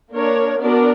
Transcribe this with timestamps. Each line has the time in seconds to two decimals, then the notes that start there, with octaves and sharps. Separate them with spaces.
0.13 A#3 D4 A#4 C#5
0.61 B3 D4 F#4 A#4 D5